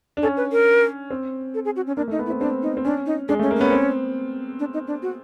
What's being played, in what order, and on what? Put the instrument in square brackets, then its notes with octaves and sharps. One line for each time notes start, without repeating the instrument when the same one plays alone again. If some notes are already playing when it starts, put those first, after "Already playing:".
[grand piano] D4
[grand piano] C#4 [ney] A4
[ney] B4
A#4
[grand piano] C4
[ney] A4
G#4
F#4
C#4
[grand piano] A#3 [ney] D4
[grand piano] A3
[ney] D#4
[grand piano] B3
[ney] E4
[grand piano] C4
[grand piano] C4 [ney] D4
[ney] D#4
[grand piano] C4
[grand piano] C#4 [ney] D4
[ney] D#4
[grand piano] G#3 [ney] D4
[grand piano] A3 [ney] C#4
[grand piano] A#3
[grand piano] B3 [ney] C#4
[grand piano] C4
[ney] D4
D#4
D4
F#4